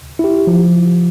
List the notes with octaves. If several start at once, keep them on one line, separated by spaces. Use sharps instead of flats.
E4 G4
F3